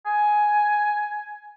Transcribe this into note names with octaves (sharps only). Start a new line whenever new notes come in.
G#5